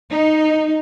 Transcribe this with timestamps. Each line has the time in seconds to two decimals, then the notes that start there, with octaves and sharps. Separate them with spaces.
0.11 D#4